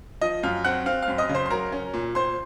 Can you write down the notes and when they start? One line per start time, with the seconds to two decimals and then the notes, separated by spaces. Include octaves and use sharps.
0.21 F3 D#5 D#6
0.43 F#2 F5 F6
0.64 C4 F#5 F#6
0.86 C4 F5 F6
1.02 F5 F6
1.08 F#2
1.18 D#5 D#6
1.29 C#3
1.35 C5 C6
1.46 C6
1.50 F#3 A#4 A#5
1.72 C#4
1.94 A#2
2.15 A#2 C5 C6